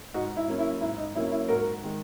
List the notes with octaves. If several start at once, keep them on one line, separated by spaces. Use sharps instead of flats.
G#2 D#4 F#4
E4
F#3 A#3 C#4
E4
G#2 E4
D#4
F#3 A#3 C#4 E4
E4
G#2 F#4 A#4
D#3 G#3